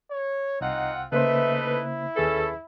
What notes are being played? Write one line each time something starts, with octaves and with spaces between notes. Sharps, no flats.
C#5
C2 C4 D#4 F4 F#5
C#3 A3 A#3 D#4 B4 C5 E5
E4
D#2 C#4 G#4 A4 B4